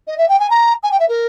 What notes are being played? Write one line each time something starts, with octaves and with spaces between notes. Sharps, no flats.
D#5
E5
G5
G#5
A#5
G#5
G5
E5
A#4